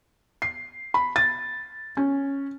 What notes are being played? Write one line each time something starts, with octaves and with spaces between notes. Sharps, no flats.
C7
B5
A6
C#4